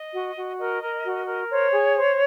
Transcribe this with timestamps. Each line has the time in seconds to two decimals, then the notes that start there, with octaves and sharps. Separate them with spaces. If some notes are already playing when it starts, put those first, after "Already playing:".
Already playing: D#5
0.13 F#4
0.36 F#4
0.58 A#4 D#5
0.82 A#4
1.04 F#4
1.27 A#4
1.49 C5 C#5
1.72 G#4
1.95 C5